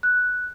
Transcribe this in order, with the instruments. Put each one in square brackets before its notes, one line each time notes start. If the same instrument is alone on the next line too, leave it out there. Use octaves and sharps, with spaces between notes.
[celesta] F#6